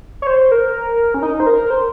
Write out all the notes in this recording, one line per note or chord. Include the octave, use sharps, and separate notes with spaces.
C#5
C5
A#4
C#4
D#4
C5
A#4
C5